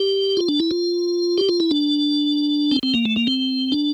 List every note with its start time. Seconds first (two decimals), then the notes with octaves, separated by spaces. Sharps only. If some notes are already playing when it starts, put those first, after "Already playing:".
Already playing: G4
0.37 F4
0.48 D4
0.60 E4
0.71 F4
1.38 G4
1.49 F4
1.60 E4
1.71 D4
2.71 C4
2.83 C4
2.94 A#3
3.05 A3
3.16 A#3
3.27 C4
3.72 D4